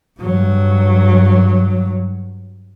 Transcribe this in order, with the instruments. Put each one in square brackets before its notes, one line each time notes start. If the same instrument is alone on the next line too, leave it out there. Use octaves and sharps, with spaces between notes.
[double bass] G2 F#3